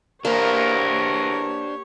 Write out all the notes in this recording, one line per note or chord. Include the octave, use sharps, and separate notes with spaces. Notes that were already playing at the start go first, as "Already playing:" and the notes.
E2 A#3 D4 G4 A#4 C5 C#5